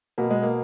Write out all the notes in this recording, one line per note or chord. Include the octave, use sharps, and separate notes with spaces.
B2 A#3
G#3
A#3